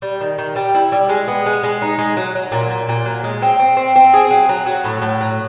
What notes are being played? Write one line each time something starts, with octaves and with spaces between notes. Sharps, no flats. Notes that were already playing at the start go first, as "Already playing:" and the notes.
G3
D#3
D#3
G3
E4
G3
G#3
B3
G#3
G#3
D#4
G#3
F#3
F#3
A#2
A#2
A#2
F#3
G#3
C4
C4
C4
C4
G#4
F#3
F#3
F#3
A2
A2
F#3